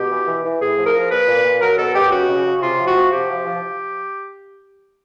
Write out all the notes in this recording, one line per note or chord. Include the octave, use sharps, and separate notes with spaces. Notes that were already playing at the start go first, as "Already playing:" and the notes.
Already playing: B2 G4
E3
E3
E3
A2 G#4
F3
A#4
F3
A#2 B4
A#2
A#2
F#3 A#4
B2 A4
B2 G4
C#3 F#4
C#3
C#3
C3 F4
F3
F#4
F3
C3 G4
F3
F3